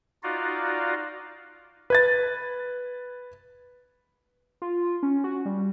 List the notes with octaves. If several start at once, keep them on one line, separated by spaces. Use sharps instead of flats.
D#4 F4 F#4 D5 D#5 F5
B4 G#6 A6
F4
C#4
F#4
G3